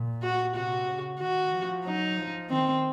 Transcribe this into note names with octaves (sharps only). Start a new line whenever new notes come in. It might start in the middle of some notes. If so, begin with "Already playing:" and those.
Already playing: A#2
F#4
C3 F#4
C#3
D#3 F#4
F3
F#3 D#4
F3
D#3 C4